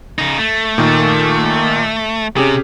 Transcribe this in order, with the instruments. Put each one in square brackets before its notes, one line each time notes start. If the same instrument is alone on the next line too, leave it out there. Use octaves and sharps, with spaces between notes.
[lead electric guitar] C#3 D#4
A3
[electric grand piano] A#2 D#3 C#6
[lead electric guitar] C3 [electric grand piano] C#4 G4 G#4